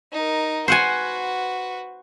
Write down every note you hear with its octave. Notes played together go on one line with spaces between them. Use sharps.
D#4 A#4
F#4 B4 C5 F#5 G#5